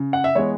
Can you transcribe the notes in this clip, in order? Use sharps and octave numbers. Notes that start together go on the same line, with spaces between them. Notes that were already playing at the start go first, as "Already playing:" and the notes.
Already playing: C#3
F#5
E5
E3 G#3 B3 C#5